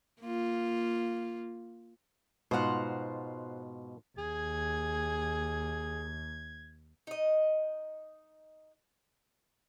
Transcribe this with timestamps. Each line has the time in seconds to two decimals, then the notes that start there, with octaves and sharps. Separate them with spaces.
0.21 A#3 F4
2.51 G#2 B2 F4 C5 F#5 A#5
4.18 D#2 G#4 G#6
7.07 D#4 D#5